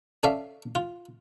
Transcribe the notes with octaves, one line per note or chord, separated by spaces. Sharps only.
C#4 A4 D5 E5 F5
F4